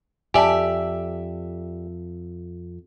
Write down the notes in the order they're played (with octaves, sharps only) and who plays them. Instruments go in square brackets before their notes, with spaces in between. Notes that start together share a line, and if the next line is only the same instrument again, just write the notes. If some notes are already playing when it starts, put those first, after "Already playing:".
[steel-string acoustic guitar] F2 E5 [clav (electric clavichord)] G4 D5 [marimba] G#5 A5